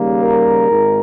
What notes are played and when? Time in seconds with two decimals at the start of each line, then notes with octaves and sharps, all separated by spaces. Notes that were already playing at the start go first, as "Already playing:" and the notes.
Already playing: D#2 C#3 G3 A#3
0.22 A#4
0.70 G#1 G#2